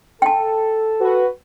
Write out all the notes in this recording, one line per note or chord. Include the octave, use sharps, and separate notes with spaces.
A4 G5 A5
F#4 B4